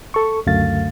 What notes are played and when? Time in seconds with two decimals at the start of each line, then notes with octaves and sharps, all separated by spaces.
0.14 A4 C#6
0.46 C#2 F#2 D3 A3 F5 A6